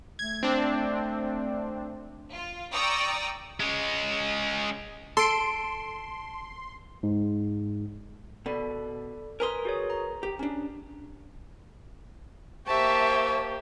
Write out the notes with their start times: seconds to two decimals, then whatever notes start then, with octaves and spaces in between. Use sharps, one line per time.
0.19 A3 G#6
0.43 C4 D4
2.32 F4
2.72 D5 G5 A#5 C#6 D#6 E6
3.60 G#3 C#4
5.17 A4 A5 C6 D7
7.03 G#2
8.46 B2 A4 D5 B5
9.40 A#4 B4 G#5 A#5 C6 D#6
9.65 F#4 G#4 C#5
9.90 A#5
10.23 G4
10.39 C#4 D4
12.67 A#3 G4 C5 E5 A5 C#6